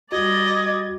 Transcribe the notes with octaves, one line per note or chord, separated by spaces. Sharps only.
G3 F#4 D5 D#5 G#6